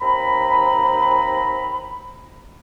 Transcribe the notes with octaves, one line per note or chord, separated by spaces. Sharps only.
D#2 C4 A#5 B5